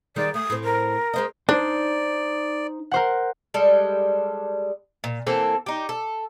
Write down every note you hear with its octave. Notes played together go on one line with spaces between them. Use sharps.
D#3 G3 G#3 D5
A3 D#6
A2 C4
A#4
G#3 C4 D#5
D4 D#4 C5 D5
A#4 C5 F#5
G3 G#3 A4
A#2
E3 A#3 C4 A4
D#4 G4
A4